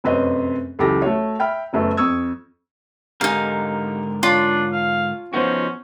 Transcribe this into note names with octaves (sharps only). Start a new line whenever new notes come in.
F1 F#2 C4 B4 C#5 D#5
C#2 E3 F#3 G4 A4 A#6
A3 F#4 C#5
E5 G5 B5 F6
F#1 F#2 A3 B3
F2 C#6 D#6 E6 G#6
G#2 D3 D#4 G4 A#4 F5 G#5
D4 F4 C#5 A5
F5
F3 B3 C#4 D#4 F#4 C5